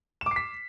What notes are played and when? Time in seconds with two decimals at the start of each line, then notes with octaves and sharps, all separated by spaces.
0.21 E7
0.26 D6
0.31 C7
0.36 B6